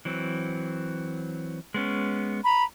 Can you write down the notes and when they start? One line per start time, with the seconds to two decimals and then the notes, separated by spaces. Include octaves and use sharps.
0.05 E3 F#3 C4
1.74 G#3 B3 C#4
2.44 A#5 B5